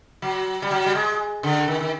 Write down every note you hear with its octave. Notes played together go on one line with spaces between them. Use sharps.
F#3
G3
F#3
G3
G#3
D3
D#3
D#3